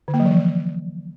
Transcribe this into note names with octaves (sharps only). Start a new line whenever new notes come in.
D3
A#3
F#3
E3
F3